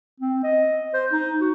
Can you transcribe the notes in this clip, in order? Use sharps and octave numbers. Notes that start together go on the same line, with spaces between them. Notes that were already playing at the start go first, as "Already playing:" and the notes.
C4
D#5
C5
D#4
F#4